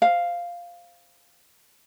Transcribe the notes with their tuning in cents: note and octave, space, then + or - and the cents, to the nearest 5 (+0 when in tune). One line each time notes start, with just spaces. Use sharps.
C5 +0 F5 +0